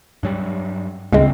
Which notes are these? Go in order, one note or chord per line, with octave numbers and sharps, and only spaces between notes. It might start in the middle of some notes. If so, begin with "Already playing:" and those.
G2 F#3 G3
G#1 C#2 G2 C3 G#3 C4